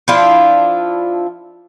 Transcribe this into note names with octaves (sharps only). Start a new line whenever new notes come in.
F3 D4 E4 F4